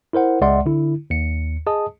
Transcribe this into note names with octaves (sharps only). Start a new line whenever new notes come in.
E4 A#4 C5 F#5
C#2 G#3 D5 E5 F#5 C6
D3 E4
D#2 C#7
G#4 D#5 A5 D#6